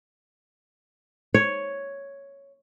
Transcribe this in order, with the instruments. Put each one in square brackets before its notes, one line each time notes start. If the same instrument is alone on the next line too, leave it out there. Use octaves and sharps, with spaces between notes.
[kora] C#5